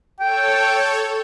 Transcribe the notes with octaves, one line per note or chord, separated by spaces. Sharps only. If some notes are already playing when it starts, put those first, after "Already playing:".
A4 C#5 G5